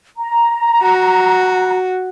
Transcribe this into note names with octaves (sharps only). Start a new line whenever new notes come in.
A#5
F#4